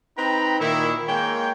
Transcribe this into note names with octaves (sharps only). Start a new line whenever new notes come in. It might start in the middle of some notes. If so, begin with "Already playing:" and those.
C4 D#4 B4 G5 A#5 B5
A#2 D#3 E4
G#3 A#3 C#5 G5